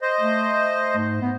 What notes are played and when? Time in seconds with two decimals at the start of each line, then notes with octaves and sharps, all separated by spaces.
0.01 C5 D#5
0.21 A3
0.96 G#2
1.22 B3